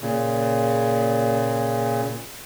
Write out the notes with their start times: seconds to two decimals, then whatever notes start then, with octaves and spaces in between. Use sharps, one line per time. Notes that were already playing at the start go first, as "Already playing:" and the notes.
0.01 A#2 C#3